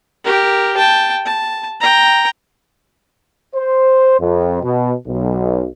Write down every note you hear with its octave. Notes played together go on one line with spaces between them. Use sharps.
G4 A#4
G5 A5
A5
G5 A#5
C5
F2
B2
B1